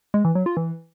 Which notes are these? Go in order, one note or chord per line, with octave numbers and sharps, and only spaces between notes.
G#3
E3
F#3
F4
E3